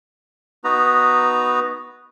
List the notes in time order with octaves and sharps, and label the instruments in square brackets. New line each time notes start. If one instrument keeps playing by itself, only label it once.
[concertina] B3 D#4 F#4 B4 A#5